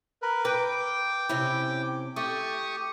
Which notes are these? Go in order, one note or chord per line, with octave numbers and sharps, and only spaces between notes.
A#4 B4
B4 G5 D6
C3 C#4 E4
A3 G4 C#6 D#6